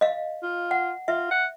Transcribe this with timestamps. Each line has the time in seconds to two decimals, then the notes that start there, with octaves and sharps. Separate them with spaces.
0.01 D#5 F5
0.43 F4
0.71 F#5
1.08 F4 E5
1.31 F#5